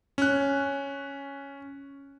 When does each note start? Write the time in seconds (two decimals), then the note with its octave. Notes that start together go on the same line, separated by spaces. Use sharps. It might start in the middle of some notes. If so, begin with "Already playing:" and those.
0.18 C#4 F#6